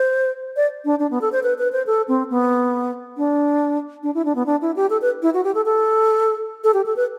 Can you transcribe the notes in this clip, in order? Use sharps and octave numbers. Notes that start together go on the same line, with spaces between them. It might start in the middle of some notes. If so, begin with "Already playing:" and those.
Already playing: C5
D5
D4
D4
B3
A4
C5
B4
B4
C5
A4
C4
B3
D4
D4
E4
D4
B3
D4
E4
G4
A4
B4
E4
F#4
G4
A4
A4
A4
G4
A4
B4